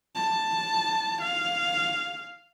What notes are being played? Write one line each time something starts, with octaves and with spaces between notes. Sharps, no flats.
A5
F5